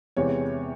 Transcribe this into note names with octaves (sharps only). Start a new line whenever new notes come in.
E2 C3 E3 G#3 C#5